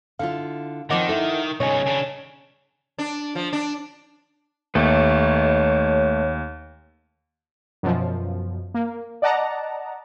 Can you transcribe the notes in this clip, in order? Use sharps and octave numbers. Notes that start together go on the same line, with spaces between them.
D3 E4 F4 F5
D#3 F3 C4 D#5 F#5 D6
E4 A4
B1 C#3 C#5 D#5 G#5
C#3 D4
D4
F3
D4
D#2 A3 B4 C#5
F#2 B2 F3
A#3
D5 D#5 F#5 A5 A#5